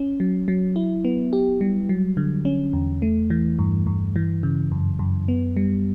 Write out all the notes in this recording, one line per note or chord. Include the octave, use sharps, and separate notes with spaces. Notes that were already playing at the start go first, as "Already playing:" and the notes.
Already playing: C#4
F#3
F#3
E4
B3
G4
G3
F#3
D3
C#4
E2
A3
E3
G2
G2
E3
C#3
F#2
F#2
B3
G3